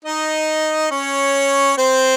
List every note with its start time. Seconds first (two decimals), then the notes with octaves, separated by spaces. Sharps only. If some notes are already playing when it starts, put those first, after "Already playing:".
0.05 D#4 D#5
0.91 C#4 C#5
1.77 C4 C5